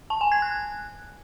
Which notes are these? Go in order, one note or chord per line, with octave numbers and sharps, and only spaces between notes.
A5
G#5
G#6
F#6